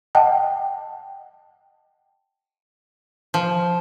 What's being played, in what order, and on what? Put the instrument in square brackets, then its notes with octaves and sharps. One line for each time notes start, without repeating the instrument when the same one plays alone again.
[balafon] D#5 F#5 G5 A5
[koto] F3